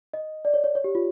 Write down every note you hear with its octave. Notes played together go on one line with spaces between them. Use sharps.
D#5
D5
C#5
C#5
C#5
G4
F4